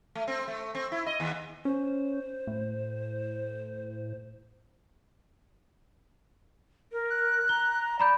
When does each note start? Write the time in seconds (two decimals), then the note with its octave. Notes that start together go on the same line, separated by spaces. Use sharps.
0.15 A3
0.28 C4
0.48 A3
0.75 C4
0.92 E4
1.06 D#5
1.20 D#2
1.65 C#4 C5
2.47 A2
6.92 A#4
7.10 F#6
7.49 A#5 G7
8.00 D5 A#5 B5 G6